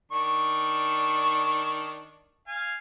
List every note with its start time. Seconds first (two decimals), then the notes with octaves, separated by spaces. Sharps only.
0.12 D#3 D4 C#6
2.48 F5 G#5